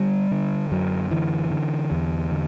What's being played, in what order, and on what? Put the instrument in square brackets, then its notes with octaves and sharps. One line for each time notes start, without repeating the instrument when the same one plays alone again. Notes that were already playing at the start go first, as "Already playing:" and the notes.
Already playing: [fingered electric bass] D3 G3
D3
F#2 F#3
D3 E3
D3
E2
D3